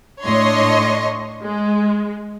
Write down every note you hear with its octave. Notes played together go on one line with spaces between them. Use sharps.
A2 D4 C#5 D#5 C6 C#6
G#3